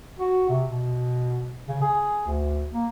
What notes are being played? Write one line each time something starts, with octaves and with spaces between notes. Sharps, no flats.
F#4
C3
B2
C#3
G#4
D2
A#3